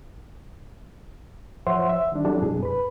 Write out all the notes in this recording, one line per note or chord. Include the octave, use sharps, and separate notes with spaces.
F3 C5 C#5 E5 F#5 C6
E5
D#3 G3 D4
F#3 G3 C4 D4 E4 A4
F#2 B2 G#4
B4 B5